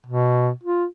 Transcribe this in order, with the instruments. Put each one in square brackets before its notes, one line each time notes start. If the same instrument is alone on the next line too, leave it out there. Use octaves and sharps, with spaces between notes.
[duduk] B2
F4